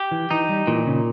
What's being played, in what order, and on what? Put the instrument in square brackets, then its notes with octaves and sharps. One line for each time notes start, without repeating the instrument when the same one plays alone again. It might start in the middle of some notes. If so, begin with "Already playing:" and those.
Already playing: [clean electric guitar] G4
[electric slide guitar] E3
[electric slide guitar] E3 [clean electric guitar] D#4
[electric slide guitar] G3
[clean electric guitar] A#2 [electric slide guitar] E3
[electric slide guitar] C#3